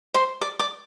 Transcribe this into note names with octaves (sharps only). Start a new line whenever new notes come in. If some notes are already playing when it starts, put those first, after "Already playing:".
C5 C6
D5 D6
D5 D6